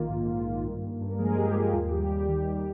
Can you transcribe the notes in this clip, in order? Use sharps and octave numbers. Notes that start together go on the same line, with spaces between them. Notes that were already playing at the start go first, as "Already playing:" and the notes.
Already playing: A#1 D#3 A#3 F4
G#2
A#3
D#3
G2
A#3
G2
A#4
F3 G#3 G#4
G2 G4
A#3 G4
D#2 F4
G3 G4
D#2 G4
D#3
D#2